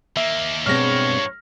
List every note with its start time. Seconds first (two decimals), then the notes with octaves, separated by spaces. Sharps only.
0.17 D#2 A#3 E5
0.66 G2 B2 G#3 C4 C#5 F6 A#6